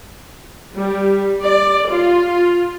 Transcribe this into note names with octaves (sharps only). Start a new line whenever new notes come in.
G3
D5
F4